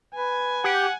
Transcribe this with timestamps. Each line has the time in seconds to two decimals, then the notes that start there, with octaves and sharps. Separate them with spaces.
0.15 B4 G#5
0.64 G4 F#5